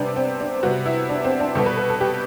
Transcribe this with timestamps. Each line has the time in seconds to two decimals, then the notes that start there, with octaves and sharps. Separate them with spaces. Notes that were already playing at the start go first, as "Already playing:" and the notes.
Already playing: C3 G3 B3 C4 D4
0.16 C4
0.40 D4
0.63 C3 G3 B3 F#4
0.86 E4
1.09 D4
1.24 C4
1.40 D4
1.55 B2 G3 B3 A4
1.66 B4
1.78 B4
1.89 A4
2.01 G4